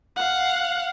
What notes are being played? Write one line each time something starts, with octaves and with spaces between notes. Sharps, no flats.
F5 F#5